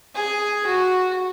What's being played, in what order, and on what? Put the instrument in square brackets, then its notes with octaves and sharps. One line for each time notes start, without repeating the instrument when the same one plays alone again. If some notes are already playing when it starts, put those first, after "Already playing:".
[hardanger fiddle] G#4
F#4